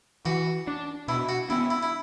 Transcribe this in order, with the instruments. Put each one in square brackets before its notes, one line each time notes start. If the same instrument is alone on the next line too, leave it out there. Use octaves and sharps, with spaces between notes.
[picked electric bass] E3 [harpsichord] F#4
[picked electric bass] D4
[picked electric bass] B2 [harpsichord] E4
[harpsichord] F#4
[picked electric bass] B3 D4 [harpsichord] E4
[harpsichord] E4
E4